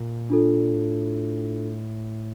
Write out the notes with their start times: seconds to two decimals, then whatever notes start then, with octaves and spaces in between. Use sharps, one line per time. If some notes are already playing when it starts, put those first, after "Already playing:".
Already playing: A#2
0.30 D4 F4 A4
0.72 A2